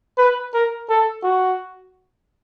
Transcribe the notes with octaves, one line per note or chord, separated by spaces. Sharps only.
B4
A#4
A4
F#4